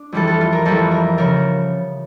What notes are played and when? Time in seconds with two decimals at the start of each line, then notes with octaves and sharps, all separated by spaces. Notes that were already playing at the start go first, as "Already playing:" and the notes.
Already playing: D4
0.12 F2 E3 G3 A4
0.27 A4
0.41 F4
0.53 A#4
0.65 F2 E3 G3 A4
0.91 A#4
1.18 C#3 F3 A#4